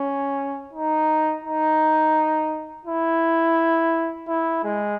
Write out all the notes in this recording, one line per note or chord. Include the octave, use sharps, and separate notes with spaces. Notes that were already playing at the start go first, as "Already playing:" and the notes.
Already playing: C#4
D#4
D#4
E4
E4
G#3